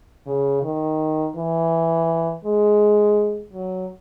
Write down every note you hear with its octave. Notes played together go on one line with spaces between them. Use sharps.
C#3
D#3
E3
G#3
F#3